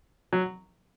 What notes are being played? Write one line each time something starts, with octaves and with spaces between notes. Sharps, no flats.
F#3